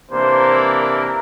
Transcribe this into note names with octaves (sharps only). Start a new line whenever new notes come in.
C3 E3 A#3 D4 C5
A#4